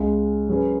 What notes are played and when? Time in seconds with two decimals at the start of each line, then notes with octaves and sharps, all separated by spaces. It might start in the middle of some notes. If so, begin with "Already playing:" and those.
Already playing: C#2 C#3 G#3
0.49 F#3 C#4 G#4 B4